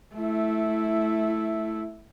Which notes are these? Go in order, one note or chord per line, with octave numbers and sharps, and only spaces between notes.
A3 E4